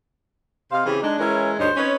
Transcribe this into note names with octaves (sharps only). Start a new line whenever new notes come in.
C3 C5 D#5 F5
C#3 E3 C4 G4
G#3 D4 D#4
E3 G#3 C#4 E4 A#4 C#5
D2 G2 D#4 C5 C#5 D#5
C4 C#4 D#4 B4 C#5